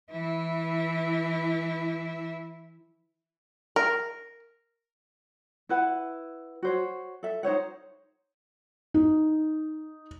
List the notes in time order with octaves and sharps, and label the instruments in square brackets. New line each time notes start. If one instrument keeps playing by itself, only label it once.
[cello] E3 E4
[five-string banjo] A#4
[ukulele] E4 B4 F#5
F#4 C5 C#5
A4 E5
D#4 C5 C#5 F#5
[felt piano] D#4